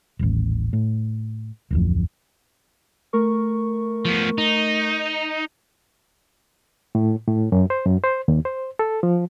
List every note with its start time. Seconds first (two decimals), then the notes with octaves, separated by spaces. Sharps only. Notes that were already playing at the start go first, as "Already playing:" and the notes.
0.19 D#1 A1
0.73 A2
1.71 D1 A1 F2
3.13 A3 A#4 C#6
4.05 F3 B3
4.38 D#4
6.95 A2
7.28 A2
7.52 F#2
7.70 C5
7.86 F#2
8.04 C5
8.28 D#2
8.45 C5
8.79 A4
9.03 F3